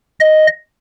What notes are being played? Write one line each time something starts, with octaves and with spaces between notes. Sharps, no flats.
D#5